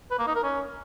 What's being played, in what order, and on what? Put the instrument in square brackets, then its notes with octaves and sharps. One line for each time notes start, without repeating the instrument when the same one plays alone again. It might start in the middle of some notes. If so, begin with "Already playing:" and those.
[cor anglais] B4
A#3
D#4
A#4
C#4